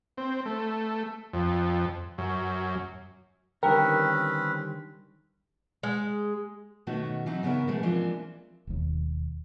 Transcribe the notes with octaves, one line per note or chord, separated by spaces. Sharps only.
C4
A3
F2
F#2
D3 D#3 G3 C4 C#4 A#4 B4 G5
G#3
B2 D#3 A3 C#4 F#4
E3 F#3 C4 D#4
C#3 B3 C#4 A#4 E5
B2 E3 G#3 A3
E3 F3 G#3 A#3 C4 D4
E1 D#2